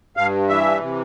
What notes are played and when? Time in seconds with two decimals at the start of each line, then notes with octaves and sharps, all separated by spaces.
0.17 G2 F5
0.49 E3 E5
0.81 C3